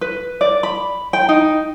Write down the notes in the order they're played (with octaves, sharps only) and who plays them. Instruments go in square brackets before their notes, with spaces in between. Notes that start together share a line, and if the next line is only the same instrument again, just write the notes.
[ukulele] B4
D5
B5
G5
D#4